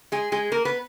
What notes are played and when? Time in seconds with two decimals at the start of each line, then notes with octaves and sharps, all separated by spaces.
0.12 G#3 G#4
0.32 G#3 G#4
0.52 A#3 A#4
0.65 B3 B4